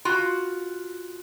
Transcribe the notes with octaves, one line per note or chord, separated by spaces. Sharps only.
F4 F#4